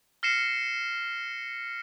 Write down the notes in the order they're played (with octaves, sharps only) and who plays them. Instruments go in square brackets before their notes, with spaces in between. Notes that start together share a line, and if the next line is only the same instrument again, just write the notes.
[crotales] F6 A#6 C7 C#7 E7